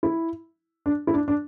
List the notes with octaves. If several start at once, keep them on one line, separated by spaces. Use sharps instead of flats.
E4
D4
E4
D4
D4